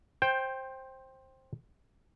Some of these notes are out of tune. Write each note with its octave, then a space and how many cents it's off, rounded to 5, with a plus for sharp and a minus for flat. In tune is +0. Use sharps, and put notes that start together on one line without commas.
C5 +15 G5 +0